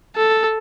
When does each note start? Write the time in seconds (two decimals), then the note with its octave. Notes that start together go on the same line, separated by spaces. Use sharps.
0.16 A4